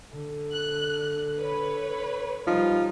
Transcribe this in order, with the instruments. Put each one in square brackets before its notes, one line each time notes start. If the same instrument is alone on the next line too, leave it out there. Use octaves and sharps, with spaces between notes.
[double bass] D3
[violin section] F#6
B4 C#5
[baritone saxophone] F3 [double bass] G3 D#4